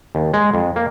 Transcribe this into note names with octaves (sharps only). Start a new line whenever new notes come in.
D#2
G#3
F2
A#3